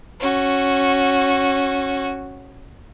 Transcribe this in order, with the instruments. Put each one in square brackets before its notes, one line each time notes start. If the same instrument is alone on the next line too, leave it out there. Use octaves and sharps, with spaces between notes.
[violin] C#4 F#4